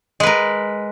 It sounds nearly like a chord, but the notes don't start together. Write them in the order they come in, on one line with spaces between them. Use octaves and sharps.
G#3 B4 A#4